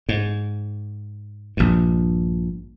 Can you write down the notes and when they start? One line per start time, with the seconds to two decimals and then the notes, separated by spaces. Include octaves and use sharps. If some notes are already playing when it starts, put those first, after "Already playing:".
0.09 G#2
1.57 A#1 G2